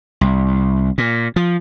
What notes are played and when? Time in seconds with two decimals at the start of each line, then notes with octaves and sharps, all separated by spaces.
0.21 C2
0.98 A#2
1.36 F3